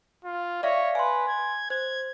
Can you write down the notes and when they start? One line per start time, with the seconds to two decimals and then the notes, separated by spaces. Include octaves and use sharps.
0.25 F4
0.63 C#5 D5 E5 F5
0.95 B4 G#5 C6
1.28 G#6
1.70 C5 G#6